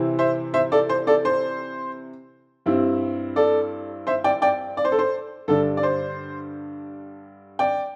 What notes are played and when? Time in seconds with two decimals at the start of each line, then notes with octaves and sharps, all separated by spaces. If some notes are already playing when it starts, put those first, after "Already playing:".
Already playing: C3 E3 C4 E4
0.19 C5 E5
0.54 C5 E5
0.72 A4 D5
0.89 C5
1.07 A4 D5
1.25 C5
2.66 G2 G3 C4 E4
3.36 A4 D5
4.07 C5 E5
4.24 D5 G5
4.42 D5 G5
4.77 D5
4.85 C5
4.92 A4
4.99 C5
5.48 G2 D3 G3 D4 A4
5.77 D5
5.83 C5
7.59 D5 G5